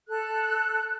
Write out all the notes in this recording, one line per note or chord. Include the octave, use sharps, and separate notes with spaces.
A4 F#6